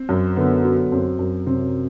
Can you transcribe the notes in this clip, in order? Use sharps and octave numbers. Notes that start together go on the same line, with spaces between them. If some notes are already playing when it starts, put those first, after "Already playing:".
Already playing: C4
F#2
D3 B3
F#3
F#2 C4
F#2
C3 C4